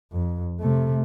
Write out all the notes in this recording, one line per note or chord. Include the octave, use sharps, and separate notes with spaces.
F2
C3 A3